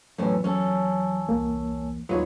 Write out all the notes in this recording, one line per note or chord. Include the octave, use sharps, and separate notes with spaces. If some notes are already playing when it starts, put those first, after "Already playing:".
E2 A2 C3 F#3 B3 C#4 B4
F#3 C#4 A4
C2 A#3
D#2 F#3 G#3 B3 D#4 F4 B4 C#5